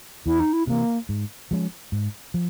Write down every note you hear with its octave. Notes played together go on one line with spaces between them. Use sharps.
E2 E4
D#4
E4
C3 E3 A#3
G#2
F3 G#3 C#4
G#2
F3